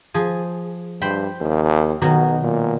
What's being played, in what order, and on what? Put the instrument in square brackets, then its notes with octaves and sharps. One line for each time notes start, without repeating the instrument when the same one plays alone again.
[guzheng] F3 G#4
[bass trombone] G2 [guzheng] C5 G5 B5
[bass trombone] D#2
[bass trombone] B1 [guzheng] B2 D#3 F#3
[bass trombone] A#2